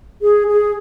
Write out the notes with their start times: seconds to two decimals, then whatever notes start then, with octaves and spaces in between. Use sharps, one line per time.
0.22 G#4
0.48 G#4